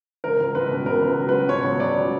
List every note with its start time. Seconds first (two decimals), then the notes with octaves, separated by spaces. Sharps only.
0.24 C#2 A#4
0.40 C#2
0.55 C#2 B4
0.71 B2
0.86 C#2 A#4
1.03 C#2 B4
1.18 F#3
1.29 B4
1.34 F#3
1.49 B2 C#5
1.65 C#2
1.80 C#2 D5
1.97 F#3